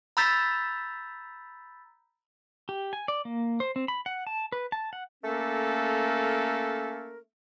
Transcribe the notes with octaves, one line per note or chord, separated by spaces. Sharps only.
A#5 B5 E6 G6 A6 B6
G4
G#5
D5
A#3
C5
C4
B5
F#5
A5
B4
A5
F#5
A3 A#3 C#4 A4 A#4